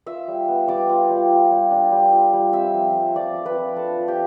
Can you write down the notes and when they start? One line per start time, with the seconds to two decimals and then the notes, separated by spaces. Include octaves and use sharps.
0.06 F4 E5 E6
0.28 G3
0.48 B3
0.68 G3 D5 D6
0.89 F4
1.10 G3
1.30 F4
1.51 G3
1.71 D4
1.92 G3
2.13 F4
2.33 G3
2.53 C4 E5 E6
2.74 F3
2.94 A3
3.15 F3 D5 D6
3.35 C4
3.46 B4 B5
3.57 F3
3.76 D4 A4 A5
3.97 F3
4.08 G4 G5